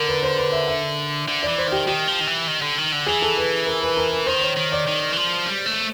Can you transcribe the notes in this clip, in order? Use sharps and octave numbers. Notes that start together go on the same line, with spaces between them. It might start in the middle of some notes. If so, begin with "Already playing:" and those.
Already playing: D3 A#4
B4
C5
B4
E5
E5
D3
D5
E3
C5
D#3 G4
D#3 G4
F3
D#3
E3
D#3
D3
D#3
D3
E3 G#4
A4
B4
A#4
B4
A#4
B4
D#3 C5
C#5
D#3
D5
D#3
E3
F3
G3
A3